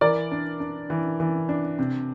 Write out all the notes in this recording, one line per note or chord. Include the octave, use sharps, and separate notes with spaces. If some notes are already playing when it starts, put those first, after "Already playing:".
E3 A#4 D5
D4
D4
E3
E3
D4
C3